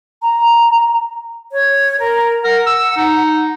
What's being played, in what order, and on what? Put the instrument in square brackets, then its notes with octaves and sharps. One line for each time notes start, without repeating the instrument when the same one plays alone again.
[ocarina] A#5
[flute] C#5
A#4
[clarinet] A#4 [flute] F#5
[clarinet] E6
D#4